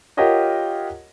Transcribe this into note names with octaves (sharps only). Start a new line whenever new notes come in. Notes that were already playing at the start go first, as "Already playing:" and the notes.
F4 G4 A#4 C#5 D#5 F#5